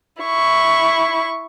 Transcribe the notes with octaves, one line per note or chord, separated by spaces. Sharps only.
E4 C#6